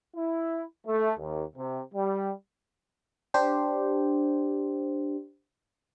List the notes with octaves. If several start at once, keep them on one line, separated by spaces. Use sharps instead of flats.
E4
A3
D#2
C3
G3
D4 G4 C5